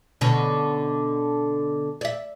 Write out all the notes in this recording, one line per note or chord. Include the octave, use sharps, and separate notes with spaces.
B2 D3 C#4
D5 E5